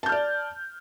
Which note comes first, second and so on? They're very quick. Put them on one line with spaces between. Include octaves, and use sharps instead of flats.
A5 G6 F6 D5